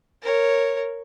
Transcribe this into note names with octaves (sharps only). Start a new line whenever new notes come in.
A#4 C#5